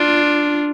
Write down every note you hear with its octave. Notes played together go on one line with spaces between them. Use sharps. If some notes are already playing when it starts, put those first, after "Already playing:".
Already playing: D4 F4